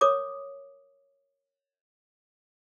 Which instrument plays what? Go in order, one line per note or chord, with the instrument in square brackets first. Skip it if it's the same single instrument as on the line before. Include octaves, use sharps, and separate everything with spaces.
[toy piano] A#4 C#5 D6 D#6